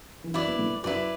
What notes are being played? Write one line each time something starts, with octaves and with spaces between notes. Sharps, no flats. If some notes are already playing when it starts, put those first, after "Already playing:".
E3
F#2 F#3 E4 B4 D5
B3
A2 A3
F#2 F#3 E4 B4 D5